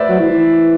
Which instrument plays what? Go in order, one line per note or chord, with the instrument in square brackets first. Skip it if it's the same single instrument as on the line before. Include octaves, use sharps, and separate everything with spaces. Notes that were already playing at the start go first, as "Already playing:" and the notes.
Already playing: [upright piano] B4 C5 D5 E5
[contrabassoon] F#3
E3
E3